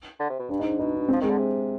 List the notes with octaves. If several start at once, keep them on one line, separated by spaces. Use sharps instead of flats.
D3
C3
B2
G2 D4
D#4
G#2
D4
B2 D#4
D4
C4
F3
D#3 G#3
D3
C3